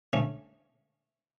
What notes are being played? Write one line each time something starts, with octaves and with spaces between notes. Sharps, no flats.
A3 C#4